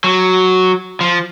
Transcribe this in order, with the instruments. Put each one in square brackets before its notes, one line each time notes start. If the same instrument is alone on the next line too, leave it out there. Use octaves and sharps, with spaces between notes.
[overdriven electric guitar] F#3
F3